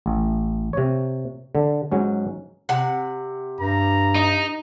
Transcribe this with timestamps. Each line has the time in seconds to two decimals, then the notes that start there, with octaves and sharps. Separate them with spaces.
0.06 A1
0.73 C3 C#5
1.55 D3
1.92 G#2 F#3 C#4
2.69 C3 F#5
3.61 G2 A#5
4.15 D#4